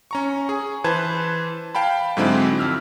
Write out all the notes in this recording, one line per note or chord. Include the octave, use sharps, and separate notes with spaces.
C#4 A#5 C#6
G#4
E3 B4 C5 A5 G#6
F5 G5 A5 B5
G#2 D3 F#3 G#3 C4 E4
F2 E6 F6